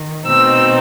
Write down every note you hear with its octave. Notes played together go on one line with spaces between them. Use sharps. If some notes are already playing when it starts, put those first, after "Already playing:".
Already playing: D#3
B2 A3 C4 D#4 E6